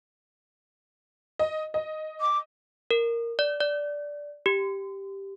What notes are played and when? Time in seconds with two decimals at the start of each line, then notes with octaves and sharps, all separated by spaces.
1.39 D#5
1.74 D#5
2.20 D6
2.91 A#4
3.39 D5
3.61 D5
4.46 G4